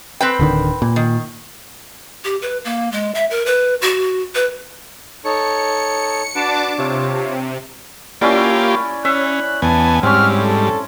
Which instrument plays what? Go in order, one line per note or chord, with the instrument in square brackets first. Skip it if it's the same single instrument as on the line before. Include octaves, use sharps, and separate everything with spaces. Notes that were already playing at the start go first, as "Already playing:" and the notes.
[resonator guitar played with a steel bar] C4 B4 G5
[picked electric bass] D1 D3 D#3
A#2
[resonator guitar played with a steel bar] D#3
[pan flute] G4
B4
A#3
G#3
E5
A#4
B4
F#4
B4
[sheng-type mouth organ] D#4 A4 C#5 [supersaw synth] C#7
[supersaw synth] D4 A5 D6 [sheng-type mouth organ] F#4 B4
[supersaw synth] C3 [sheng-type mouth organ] F4 C#5
[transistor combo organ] A#3 F4 G4 [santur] C#4 E4 D5
[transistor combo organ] C#4 [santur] E5 [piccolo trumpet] F#6
[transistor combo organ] E2 B3 G#5 [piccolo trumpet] A5
[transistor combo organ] G#2 G3 [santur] C4 C#4 [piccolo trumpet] F6
[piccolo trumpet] A4